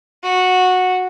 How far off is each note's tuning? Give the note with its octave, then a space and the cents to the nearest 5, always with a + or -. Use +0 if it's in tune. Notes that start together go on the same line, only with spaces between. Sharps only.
F#4 -10